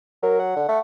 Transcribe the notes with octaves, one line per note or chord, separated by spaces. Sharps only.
F#3 A#4
F#5
D3
A3